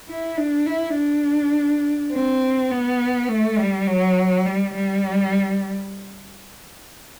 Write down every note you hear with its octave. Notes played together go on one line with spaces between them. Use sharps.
E4
D4
E4
D4
C4
B3
A3
G3
F#3
G3
G3